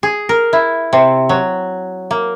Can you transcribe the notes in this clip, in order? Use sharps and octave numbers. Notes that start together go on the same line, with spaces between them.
G#4
A#4
E4
C3
F#3
A#3